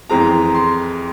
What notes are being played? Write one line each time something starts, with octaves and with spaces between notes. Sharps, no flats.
F2 E3 G#3 C4 A#5
C6